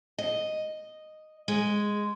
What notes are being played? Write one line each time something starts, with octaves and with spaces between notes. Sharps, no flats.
D#5
G#3